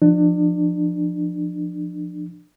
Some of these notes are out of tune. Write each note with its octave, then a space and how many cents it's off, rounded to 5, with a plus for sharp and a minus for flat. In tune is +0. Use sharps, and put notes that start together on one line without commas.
F3 +0 D4 +30